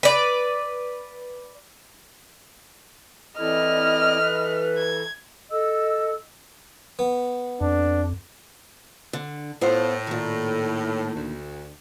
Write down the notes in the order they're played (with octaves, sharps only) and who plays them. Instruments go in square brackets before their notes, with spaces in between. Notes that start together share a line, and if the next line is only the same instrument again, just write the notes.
[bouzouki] B4 D5
[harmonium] E3 A4 [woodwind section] C4 E4 D5 [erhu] D#5 [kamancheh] F6
[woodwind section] B4
[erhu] G#6
[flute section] A4 D#5 E6
[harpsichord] B3
[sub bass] F2 [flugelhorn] D4
[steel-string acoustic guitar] D3
[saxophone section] A2 [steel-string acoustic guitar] B3 F4 C5
[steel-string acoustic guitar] A#2 D#3
[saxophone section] D2